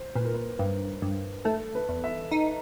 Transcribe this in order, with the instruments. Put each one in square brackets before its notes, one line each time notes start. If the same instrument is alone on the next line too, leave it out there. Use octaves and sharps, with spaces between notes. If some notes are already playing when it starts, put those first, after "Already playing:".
Already playing: [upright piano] C5
[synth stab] A#2 [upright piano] B4
[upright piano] A#4
B4
[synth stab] G2 [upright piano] B4
[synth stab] G2
[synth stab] A3 [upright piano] A4
[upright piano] B4
[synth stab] E2
[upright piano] E5
[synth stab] D#4